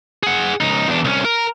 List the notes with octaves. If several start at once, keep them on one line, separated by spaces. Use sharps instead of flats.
G#4 F#5
C#2 D#4
E2 D4
C2 C#4
A#4